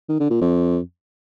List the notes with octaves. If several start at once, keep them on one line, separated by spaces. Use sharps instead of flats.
D#3
D3
A#2
F2